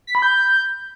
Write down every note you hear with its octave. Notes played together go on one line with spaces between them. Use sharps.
B6
B5
G6